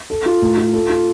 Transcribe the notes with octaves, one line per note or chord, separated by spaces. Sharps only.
A4
F4
A2
F4
A4
F4